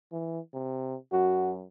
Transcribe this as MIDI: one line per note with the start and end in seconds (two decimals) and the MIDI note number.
0.12 0.39 52
0.54 0.96 48
1.12 1.65 42
1.12 1.53 66